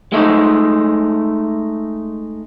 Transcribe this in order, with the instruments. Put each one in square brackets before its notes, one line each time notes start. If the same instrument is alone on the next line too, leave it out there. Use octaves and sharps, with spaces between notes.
[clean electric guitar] G#3 A3 C#4 D#4